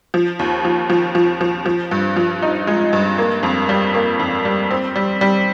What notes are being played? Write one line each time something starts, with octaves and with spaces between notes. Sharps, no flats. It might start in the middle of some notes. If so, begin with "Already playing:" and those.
F3
D#2
F3
F3
F3
F3
F3
G2
F3
D#4
G#3
G2
A#3
F2
G3
A#3
F2
G3
C4
G3
G3